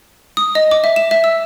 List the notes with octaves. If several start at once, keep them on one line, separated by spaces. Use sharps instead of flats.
D#6
D#5
D6
E5
E7
E5
E6